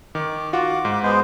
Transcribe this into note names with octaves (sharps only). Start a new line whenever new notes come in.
D#3 D6
F4 F#4 F#5 D6
G#2
G#3 B3 C5